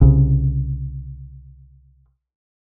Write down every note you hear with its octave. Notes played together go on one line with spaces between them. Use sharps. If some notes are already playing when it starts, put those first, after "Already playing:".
C2 C#3